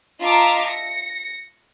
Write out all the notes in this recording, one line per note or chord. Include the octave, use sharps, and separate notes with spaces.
F4 D#5 E5 A5 A#5 D6
A#6 C#7